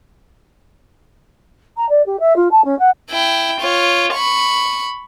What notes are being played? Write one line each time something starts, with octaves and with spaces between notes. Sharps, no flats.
A#5
D5
G4
E5
F4
A5
C#4
F#5
E4 G5
F4 C#5
B5 C#6